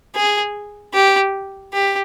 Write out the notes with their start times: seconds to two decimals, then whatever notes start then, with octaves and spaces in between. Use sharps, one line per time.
0.15 G#4
0.94 G4
1.73 G4